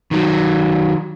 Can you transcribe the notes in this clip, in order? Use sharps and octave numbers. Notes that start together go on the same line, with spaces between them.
D#3 F#3